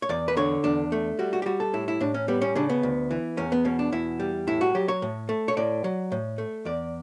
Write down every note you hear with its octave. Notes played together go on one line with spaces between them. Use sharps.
C#5
E2 D5
B4
D3 C#5
E2 D4
A3
G3 F#4
F#4
G4
G3 F#4
A4
A2 E4
E4
A2 D4
C#4
G3 B3
C#4
C#3 D4
B3
D2
E3
E2 C#4
B3
B2 C#4
D4
E2 E4
G3
A2 E4
F#4
F#3 G4
C#5
A2
A3
C#5
A2 D5
F#3
A2
A3
E2 D5